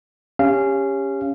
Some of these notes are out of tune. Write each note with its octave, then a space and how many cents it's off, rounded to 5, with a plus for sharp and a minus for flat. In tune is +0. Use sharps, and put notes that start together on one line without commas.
C#4 +0 G4 +25 F5 -20